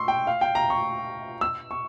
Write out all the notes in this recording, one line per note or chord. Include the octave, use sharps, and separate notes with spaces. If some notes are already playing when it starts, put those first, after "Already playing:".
Already playing: C6 C#6 E6
G5
F5
G5
A#5
C#6
E6
C#6